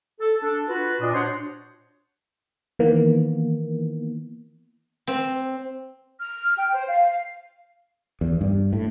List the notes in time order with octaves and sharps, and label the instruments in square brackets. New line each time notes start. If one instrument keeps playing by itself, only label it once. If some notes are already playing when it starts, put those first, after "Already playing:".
[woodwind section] A4
D4 A4
F4 F#4 B4
A#2 D4 D#5
D4 F#4 C5 C#5 F#5 C6
[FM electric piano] D#3 E3 A#3 B3
[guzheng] C4
[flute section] F6
G5
C5
F5
[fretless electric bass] E2
G2
A2